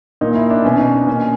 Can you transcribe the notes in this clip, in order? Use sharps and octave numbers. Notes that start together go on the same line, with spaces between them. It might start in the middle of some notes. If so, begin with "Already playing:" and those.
A#2 D#4
E4
D4
B2 C#4
D#4
D4
A#2 C#4